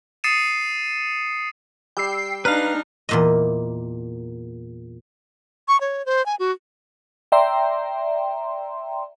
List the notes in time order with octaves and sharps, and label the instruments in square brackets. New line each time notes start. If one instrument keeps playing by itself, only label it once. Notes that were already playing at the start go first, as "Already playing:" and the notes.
[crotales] D#6 A6 C7 C#7 D#7 E7
[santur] G3 [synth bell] G5 E6 C7
[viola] D4 D#4 [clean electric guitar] B4 F5 [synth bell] A#5 F6
[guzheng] E2 A#2 D#5
[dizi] C#6
C#5
C5
G#5
F#4
[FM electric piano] D5 E5 G5 A#5 C6